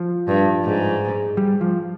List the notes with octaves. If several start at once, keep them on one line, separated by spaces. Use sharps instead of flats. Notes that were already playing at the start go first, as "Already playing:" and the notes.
Already playing: F3
G2
G#2
G3
F3